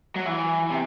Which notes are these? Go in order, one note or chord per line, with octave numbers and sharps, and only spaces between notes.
F#3
E3
C3